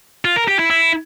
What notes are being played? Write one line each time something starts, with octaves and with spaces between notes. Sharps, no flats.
F4
A#4
G4
E4
E4